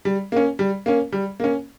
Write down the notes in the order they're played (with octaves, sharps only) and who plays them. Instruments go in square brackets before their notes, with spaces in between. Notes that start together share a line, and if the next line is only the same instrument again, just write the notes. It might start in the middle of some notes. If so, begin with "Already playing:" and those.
[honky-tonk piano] G3
A#3 C#4
G3
A#3 C#4
G3
A#3 C#4